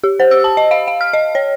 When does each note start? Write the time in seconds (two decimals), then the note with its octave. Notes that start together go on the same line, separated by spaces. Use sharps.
0.04 G4
0.20 C5
0.31 E6
0.44 A5
0.57 D#5
0.71 F5
0.88 F5
1.01 F6
1.13 D#5
1.35 C#5